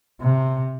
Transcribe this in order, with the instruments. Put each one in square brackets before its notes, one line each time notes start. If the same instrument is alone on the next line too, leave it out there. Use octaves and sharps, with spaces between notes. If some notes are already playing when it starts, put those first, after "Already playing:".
[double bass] C3